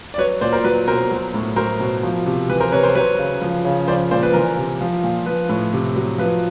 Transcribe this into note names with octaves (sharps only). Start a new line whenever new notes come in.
D5
F#3 B4 C#5
A#2 C5 D5
A#4 C5
F#3 B4
B2 A#4 C5
F#3
A2
F#3 A#4 C5
B2
F3
C3
E3 B4
A#4 C5
C3 B4 C#5
A#4 C5
F#3 B4 C#5
C#3
F3
C#3
F3 C5 D5
A#2 C5 D5
B4
E3 A#4
C3
F3
A#2
F3 B4
A2
C3
F#3
F3 B4